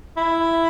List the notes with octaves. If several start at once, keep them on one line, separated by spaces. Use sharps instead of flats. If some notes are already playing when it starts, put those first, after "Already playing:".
E4